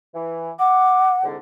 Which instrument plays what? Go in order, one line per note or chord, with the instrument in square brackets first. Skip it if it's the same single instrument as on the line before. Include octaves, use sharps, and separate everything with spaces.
[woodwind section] E3
[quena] F#5 [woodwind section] D6
[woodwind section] C2 G#2 D3